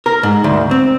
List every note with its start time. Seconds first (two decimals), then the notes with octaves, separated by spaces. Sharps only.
0.06 A#4
0.23 G#2
0.44 D2
0.71 C4